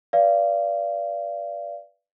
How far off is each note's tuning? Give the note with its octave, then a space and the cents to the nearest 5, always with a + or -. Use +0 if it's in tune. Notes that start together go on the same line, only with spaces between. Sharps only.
B4 +0 D5 +0 F5 -30